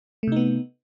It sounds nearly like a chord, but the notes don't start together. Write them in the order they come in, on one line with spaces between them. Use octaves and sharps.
A3 C3 D#4 B3